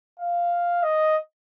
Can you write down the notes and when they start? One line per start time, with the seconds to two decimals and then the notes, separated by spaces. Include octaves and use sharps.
0.19 F5
0.83 D#5